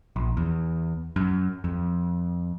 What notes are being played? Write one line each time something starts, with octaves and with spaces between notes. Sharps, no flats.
A#1
E2
F#2
F2